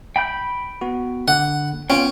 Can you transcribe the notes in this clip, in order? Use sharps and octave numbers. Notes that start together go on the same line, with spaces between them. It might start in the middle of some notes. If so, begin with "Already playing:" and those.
G5 B5 G6
B3 F#4
D3 F#5
B3 C#4 F4 G5